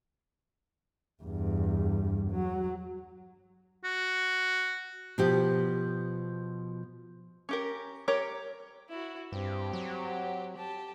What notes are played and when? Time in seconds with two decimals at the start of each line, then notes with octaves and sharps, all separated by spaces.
1.23 E2 G2
2.31 F#3
3.84 F#4
5.18 B2 F3 G4
7.49 C#4 G4 A#4
8.08 G4 A#4 C#5 A#5
8.89 E4 F#4
9.32 G2 C4 G4
9.73 F#3
10.56 G4 A5